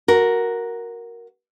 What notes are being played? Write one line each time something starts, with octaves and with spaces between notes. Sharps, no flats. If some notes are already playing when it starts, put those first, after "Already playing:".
F#4 A#4